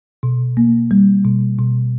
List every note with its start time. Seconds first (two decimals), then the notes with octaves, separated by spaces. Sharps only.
0.23 B2
0.57 A#3
0.91 G3
1.25 B2
1.59 B2